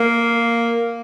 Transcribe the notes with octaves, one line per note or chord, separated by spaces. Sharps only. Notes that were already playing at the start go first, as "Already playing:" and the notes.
Already playing: A#3